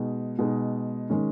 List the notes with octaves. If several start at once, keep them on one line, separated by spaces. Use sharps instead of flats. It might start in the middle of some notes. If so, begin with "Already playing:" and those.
Already playing: B2 G#3 D#4 G#4
B2 G#3 D#4 G#4
D#3 G#3 C#4